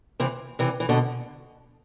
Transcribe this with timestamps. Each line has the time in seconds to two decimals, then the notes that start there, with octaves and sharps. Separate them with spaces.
0.20 C3 E3
0.59 C3 E3
0.80 E3
0.89 B2 D3